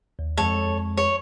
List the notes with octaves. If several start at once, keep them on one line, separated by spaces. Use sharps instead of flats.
D#2
F2 G#3 A4 C#5
C#5